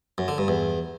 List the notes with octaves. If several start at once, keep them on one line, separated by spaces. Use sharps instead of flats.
F#2
D3
G2
E2